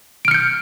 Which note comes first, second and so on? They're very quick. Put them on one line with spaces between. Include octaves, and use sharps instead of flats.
D7 F6 C#7 G6